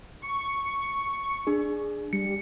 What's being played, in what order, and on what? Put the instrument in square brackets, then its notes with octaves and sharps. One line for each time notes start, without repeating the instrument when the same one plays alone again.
[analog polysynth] C#6
[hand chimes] D4 G#4
[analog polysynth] G3 [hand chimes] C#7